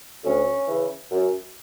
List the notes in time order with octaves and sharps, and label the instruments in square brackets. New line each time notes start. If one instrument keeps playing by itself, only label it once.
[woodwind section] D2 C#4
C#3 E3
F#2